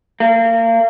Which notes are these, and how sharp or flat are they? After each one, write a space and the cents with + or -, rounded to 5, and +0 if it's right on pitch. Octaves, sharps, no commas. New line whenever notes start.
A#3 -35